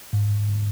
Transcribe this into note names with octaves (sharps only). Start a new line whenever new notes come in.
G#2